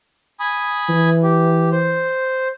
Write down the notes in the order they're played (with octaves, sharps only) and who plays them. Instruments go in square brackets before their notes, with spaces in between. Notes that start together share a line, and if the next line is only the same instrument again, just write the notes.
[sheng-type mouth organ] G#5 B5 D#6
[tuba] E3
[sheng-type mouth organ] G4
C5